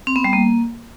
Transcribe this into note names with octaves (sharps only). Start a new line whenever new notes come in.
C4
B3
G3
A#3